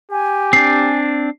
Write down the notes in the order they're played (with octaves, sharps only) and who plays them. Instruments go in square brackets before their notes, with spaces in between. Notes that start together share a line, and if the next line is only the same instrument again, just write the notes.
[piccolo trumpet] G4 [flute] G#5
[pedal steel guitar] C4 D4 [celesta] C7